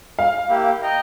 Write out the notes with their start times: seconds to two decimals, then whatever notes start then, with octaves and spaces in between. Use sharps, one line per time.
0.19 F5
0.49 A#3 E4 G4
0.83 D#5 G5 A#5